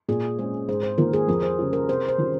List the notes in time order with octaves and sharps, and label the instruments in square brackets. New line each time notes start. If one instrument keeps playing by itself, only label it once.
[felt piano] A#2 [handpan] G#4
[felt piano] G#3 C#4 [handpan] C5
[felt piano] G#2 [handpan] C5
[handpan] C5
[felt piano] D#3 A#3 F4 [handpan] A#4
[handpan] G#4
[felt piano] F2 [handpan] A#4
[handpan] C5
[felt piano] C#3 G3 C#4 F4
[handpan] A#4
[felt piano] C3 [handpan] C5
[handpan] C5
[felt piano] D#3 G3 C#4 F4